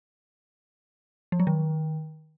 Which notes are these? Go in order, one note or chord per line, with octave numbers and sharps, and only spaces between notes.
F3
F#3
D#3